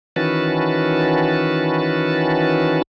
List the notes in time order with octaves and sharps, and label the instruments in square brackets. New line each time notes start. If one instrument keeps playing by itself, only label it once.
[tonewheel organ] D#3 E3 C#4 F#4 B4 A5